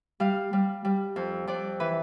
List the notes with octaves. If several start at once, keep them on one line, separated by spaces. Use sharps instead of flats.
G3 F5
G3
G3
F2
F2 D5
E3 B4